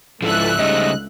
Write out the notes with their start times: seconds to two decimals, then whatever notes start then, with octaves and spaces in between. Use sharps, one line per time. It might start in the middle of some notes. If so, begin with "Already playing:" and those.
0.22 C#2 G#2 D3 E3 F3 A4 E5 F#6
0.59 G#2 C#3 G3 A3 D#5